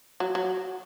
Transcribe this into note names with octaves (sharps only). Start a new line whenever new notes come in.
F#3
F#3